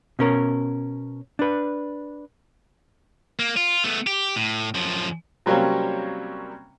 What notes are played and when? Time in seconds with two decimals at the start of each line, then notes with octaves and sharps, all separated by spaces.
0.19 B2 C#4 A#4
1.39 D4 B4
3.39 A#3
3.57 F4
3.84 A3 B3
4.07 G4
4.36 A2
4.75 F#2 F3
5.46 C3 F#3 G3 A#3 C4 C#4